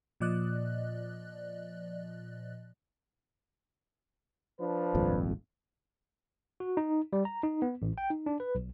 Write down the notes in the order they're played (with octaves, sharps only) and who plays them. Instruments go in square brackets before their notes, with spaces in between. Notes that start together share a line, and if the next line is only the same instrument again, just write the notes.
[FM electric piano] A#2 F3 D5 D#5 F#6
[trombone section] F3 D4 B4
[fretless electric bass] D#1 G#1 F2
[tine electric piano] F#4
D#4
G3
A#5
D#4
B3
A1
G5
D#4
D4
B4
B1